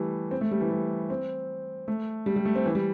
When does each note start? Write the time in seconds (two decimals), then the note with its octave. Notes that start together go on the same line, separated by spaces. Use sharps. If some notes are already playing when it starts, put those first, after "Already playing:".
Already playing: E3 G3 A3
0.31 C4
0.41 A3
0.51 G3
0.61 E3
0.71 G3
1.10 C4
1.88 A3
2.26 G3
2.36 G3
2.45 A3
2.55 C4
2.66 E3
2.75 G3